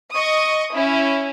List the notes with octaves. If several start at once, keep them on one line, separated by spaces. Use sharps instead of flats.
D#5 C#6 D#6
C#4 E4